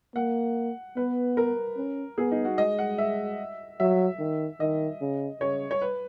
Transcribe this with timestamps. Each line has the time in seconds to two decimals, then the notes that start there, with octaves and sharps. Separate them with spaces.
0.15 A#3 F#5
0.96 B3 B4
1.37 A#4
1.77 C#4
2.18 B3 G#4
2.31 D#4
2.45 F#4
2.58 G#3 D#5
2.79 F#5
2.98 E5
3.80 F#3 E5
4.19 D#3
4.60 D#3 D#5
5.01 C#3
5.40 C#3 C#5
5.71 C#5
5.82 B4